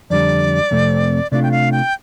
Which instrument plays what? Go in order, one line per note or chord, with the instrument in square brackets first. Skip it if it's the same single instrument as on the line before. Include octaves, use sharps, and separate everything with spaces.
[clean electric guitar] F2 D3 G3 [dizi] D5
[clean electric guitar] F2 C3 A3 C4
[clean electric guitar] C3 A3 D4 F4 [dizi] D5
[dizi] G5
F5
G5